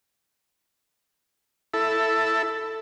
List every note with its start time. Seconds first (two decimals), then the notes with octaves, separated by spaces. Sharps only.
1.74 E4 A4